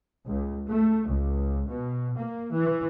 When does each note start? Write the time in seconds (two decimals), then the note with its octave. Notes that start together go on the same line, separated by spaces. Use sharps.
0.27 C#2
0.70 A3
1.08 C#2
1.68 B2
2.18 A#3
2.52 E3